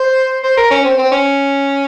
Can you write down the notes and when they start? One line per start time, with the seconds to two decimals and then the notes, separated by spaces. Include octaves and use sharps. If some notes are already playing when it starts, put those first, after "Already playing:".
Already playing: C5
0.43 C5
0.57 A#4
0.70 C#4
0.85 C4
0.98 C4
1.12 C#4